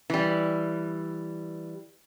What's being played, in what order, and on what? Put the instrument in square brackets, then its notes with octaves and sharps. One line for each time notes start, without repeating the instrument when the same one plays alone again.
[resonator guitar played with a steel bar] E3 G3